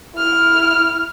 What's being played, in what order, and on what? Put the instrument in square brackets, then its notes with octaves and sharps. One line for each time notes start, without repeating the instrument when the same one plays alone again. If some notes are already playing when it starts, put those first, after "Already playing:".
[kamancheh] E4 F6